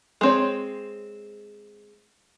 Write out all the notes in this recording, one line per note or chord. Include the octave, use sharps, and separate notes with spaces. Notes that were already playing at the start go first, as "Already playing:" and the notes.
G#3 C4 C#5